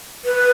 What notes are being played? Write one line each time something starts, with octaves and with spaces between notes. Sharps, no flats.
B4